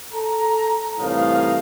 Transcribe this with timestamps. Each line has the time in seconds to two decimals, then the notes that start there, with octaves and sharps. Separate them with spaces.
0.13 A4 A#5
0.99 C2 A2 E3 D#4 F5